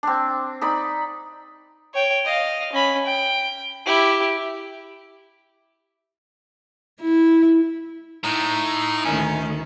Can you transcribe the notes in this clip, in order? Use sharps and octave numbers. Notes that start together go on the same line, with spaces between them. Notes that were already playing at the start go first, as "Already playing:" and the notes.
C4 D4
D#4 D5 B5
C#5 G5
D#5 F5
C#4 B5
G5
E4 G4
E4
A2 D#4
D2 D#3 C#4